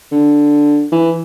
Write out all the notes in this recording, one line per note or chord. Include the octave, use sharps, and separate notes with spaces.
D3
E3